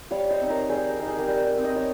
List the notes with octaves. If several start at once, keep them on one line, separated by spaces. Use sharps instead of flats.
G3 C#5 F5
C5 D#5
C4 D#4
A#4 C#5
G3 G#4 C5
C4 D#4 A#4
G#4
G4 A#4
G3
C4 D#4
D#5
C#5